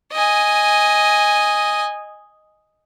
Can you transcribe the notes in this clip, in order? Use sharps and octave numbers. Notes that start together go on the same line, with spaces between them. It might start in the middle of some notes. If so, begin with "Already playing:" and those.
D#5 G#5